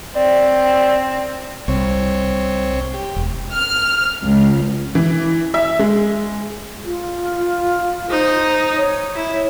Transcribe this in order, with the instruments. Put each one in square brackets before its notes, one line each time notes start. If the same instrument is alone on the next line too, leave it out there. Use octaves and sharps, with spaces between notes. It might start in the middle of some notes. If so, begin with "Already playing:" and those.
[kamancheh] C4 [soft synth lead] D5
[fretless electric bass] C2 [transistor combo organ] C4 C#5
[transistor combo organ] G4
[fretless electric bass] E1
[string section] F6
C#2
[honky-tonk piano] E3
E5
G#3
[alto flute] F4
[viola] D#4 [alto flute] C5
[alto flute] C#5
[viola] E4